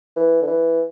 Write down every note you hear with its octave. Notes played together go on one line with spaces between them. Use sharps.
E3
D3
E3